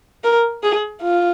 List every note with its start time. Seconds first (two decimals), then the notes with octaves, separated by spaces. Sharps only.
0.24 A#4
0.63 G#4
1.02 F4